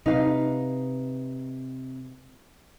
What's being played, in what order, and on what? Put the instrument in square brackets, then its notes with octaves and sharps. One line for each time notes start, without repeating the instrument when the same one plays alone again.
[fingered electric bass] C3 [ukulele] D#4 B4 F5